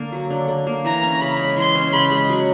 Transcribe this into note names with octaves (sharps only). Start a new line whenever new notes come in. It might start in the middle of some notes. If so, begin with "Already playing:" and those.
Already playing: D3 A#3
F#3
D3
D3
A#3
E3 A#5
C#4
C#3 B5
G#3
E3 C6
C#4
C#3 B5
G#3
F#3